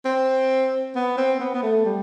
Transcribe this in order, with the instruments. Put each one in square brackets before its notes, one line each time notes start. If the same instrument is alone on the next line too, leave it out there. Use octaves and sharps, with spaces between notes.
[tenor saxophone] C4
B3
C4
B3
B3
A3
G3